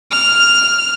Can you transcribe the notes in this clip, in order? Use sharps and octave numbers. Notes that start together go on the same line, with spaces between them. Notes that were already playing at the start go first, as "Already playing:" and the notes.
F6